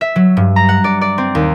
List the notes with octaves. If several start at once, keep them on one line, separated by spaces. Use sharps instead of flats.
E5
F#3
G2
A#5
F#5
D5
D5
C4
D#2